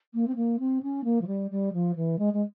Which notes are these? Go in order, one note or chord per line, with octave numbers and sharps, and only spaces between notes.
A#3
C4
A#3
C4
C#4
A#3
F3
G3
G3
F3
E3
G#3
G#3